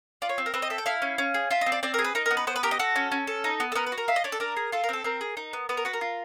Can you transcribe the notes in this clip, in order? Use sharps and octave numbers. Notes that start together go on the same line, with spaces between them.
F4 D5
C#5
C4
A#4
C4 B4
D#5
A4 E5
G5
E4 F5
C#4
C#4
G#4
F4 E5
D#5
C4
D5
C4 D5
G#4 A#4
B4
D#4 A#4
B3 A#4
B4
B3 C5
B4
G4 A#4
D#5
F#4 A4
C#4
C#4
A4
D#4
B3
A4
B3 A#4
B4
F#4
A#4
F4 E5
D#5
D4 C#5
A4
D4 A#4
G#4
F4 A4
A#4
C4 A4
C4 A#4
G#4
D#4
B3
B3 B4
A#4
F#4 B4
A#4
F4